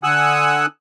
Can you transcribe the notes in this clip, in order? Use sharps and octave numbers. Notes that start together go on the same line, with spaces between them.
D3 F#5 G#5 D#6 E6 F#6